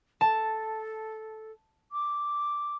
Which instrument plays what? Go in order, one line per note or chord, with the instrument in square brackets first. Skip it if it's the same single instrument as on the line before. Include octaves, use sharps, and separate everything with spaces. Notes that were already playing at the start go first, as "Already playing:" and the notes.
[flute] A4 [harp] A5
[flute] D6